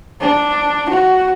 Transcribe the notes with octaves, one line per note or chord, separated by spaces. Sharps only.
D4
F#4